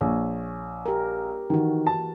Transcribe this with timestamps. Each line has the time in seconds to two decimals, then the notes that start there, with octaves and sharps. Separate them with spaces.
0.01 A#1 C#5
0.86 G4 A#4
1.50 D#3 E3 F#4
1.87 A5